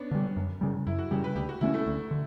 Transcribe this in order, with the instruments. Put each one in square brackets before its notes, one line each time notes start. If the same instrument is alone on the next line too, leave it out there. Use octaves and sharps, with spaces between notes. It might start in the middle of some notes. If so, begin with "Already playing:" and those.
Already playing: [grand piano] B3 C#4 D4
[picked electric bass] D3 G3
F#2
C#3 G3
[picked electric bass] F#2 [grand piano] E4
[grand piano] F#4
[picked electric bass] C#3 G3 [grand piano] G4
[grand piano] B4
[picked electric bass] D2 [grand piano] G4
[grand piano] F#4
[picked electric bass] D3 A3 C#4 [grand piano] E4
[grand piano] A3
[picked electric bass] D2
D3